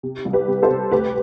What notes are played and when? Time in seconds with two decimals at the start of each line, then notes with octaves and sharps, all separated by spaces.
0.03 C3
0.25 C2
0.33 G4 B4
0.48 C3
0.63 A4 C5
0.71 C3
0.91 D2 G4 B4